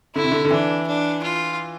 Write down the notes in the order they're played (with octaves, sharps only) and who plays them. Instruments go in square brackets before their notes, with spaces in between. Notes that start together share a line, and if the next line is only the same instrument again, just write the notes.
[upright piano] D3 [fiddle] E4
[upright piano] C3
D3
D3
[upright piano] E3 [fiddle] D4
[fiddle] D4
F4